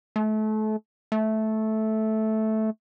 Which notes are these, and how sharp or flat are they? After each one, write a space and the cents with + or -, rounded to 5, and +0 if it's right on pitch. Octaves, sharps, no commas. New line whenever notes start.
A3 -30
A3 -10